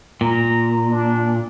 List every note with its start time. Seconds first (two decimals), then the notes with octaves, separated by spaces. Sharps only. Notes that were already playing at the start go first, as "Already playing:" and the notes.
0.21 A#2 A#5
0.91 D4